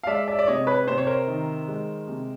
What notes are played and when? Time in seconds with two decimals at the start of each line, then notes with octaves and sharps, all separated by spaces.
0.03 F5
0.07 G#3 D5 E5
0.28 D5 E5
0.39 D5
0.47 C3 C#5 D#5
0.67 B4 C#5
0.87 C3 C5
0.98 C#5
1.07 A#4 C5
1.27 D#3
1.68 G#3
2.08 C3